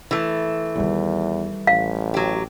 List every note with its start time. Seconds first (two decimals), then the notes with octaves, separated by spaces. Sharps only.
0.11 E3 A3
0.76 E2 D#3 G3
1.67 A1 F5
2.14 F#3 G4